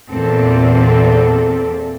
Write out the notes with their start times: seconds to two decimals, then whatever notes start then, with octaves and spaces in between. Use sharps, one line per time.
0.10 E2 A#2 C4 A4